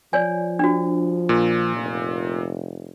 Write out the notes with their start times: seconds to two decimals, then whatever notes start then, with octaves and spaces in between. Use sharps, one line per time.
0.13 F3 C#5 D5 G#5
0.59 D4 F#4
1.29 A#2
1.76 F1